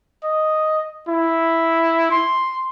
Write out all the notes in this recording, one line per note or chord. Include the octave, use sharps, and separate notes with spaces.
D#5
E4
C6